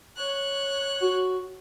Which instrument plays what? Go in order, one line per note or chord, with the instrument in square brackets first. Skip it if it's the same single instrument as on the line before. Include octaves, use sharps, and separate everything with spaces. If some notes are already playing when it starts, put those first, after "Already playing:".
[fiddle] C#5 F#6
[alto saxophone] F#4